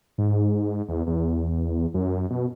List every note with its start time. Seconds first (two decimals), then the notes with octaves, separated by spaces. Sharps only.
0.18 G#2
0.88 E2
1.07 E2
1.94 F#2
2.30 B2